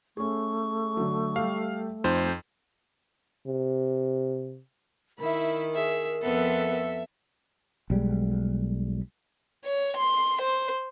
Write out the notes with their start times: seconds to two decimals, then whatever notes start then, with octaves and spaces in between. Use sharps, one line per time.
0.17 A3 C#4 G#4 C#6
0.97 D3 F#3
1.36 G3 G4 F5
2.04 F2 D#4 C5
3.47 C3
5.20 D#3 E4 A#4 E5 B5
5.75 G#4 E5
6.22 F2 B3 A4 E5
7.90 B1 G3 G#3
9.65 C#5
9.98 C6
10.42 C5